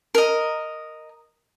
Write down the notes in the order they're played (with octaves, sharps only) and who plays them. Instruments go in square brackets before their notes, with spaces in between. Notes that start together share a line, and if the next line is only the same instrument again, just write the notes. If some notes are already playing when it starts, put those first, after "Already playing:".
[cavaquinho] A#4 D#5